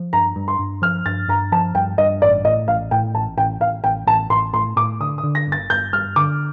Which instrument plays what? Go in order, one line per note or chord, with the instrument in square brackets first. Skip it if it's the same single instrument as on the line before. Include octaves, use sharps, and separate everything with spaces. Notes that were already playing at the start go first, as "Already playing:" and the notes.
Already playing: [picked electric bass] F3
[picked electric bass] G2 [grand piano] A#5
[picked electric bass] G2
[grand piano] C6
[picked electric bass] G2
[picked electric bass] F3 [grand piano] F6
[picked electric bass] G2 [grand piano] A6
[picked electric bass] G2 [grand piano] A#5
[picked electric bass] F3 [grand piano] A5
[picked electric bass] G2 [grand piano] G5
[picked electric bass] G2 [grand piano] D#5
[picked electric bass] A1 [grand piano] D5
[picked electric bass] A2 [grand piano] D#5
[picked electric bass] A1 [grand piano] F5
[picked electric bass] A2 [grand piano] G5
[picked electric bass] A1 [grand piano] A5
[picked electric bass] A1 [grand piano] G5
[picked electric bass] A1 [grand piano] F5
[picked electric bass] A1 [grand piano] G5
[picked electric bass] A1 [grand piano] A5
[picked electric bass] A1 [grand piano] C6
[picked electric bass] A2 [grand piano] C6
[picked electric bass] A2 [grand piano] D6
[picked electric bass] D3 [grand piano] D#6
[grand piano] D#6
[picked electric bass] D3
[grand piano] A#6
[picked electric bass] G1
[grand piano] A6
[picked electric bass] G1 [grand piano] G6
[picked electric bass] G2 [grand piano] F6
[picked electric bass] D3 [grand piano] D6